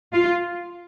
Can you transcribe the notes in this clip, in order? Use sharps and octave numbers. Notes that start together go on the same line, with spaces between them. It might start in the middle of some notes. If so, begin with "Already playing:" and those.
F4